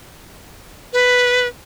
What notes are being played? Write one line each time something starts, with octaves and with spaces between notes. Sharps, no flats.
B4